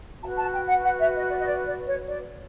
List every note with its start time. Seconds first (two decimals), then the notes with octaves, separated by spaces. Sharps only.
0.22 F#4 B4 A5
0.38 A5
0.53 G5
0.68 F#5
0.84 F#5
0.99 E5
1.15 D#5
1.30 D5
1.39 D#5
1.46 D5
1.66 D5
1.87 C#5
2.07 D5